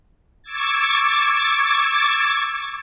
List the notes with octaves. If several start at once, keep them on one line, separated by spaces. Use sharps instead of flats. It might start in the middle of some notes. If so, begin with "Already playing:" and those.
C#6 D6 E6 G#6 A6